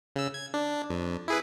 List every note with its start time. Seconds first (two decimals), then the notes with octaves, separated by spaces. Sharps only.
0.16 C#3 E6
0.34 G#6
0.54 D4
0.90 F2
1.28 E4 G#4 B4